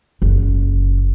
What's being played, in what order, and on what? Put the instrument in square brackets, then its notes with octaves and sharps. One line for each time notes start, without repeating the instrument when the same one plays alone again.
[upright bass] F#1